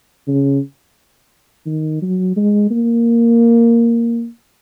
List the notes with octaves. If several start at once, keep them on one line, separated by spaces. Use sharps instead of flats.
C#3
D#3
F#3
G#3
A#3